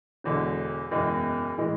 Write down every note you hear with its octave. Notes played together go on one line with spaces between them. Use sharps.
E1 E2 D3 G#3
F#1 E2 B2 G#3
A2 E3 G#3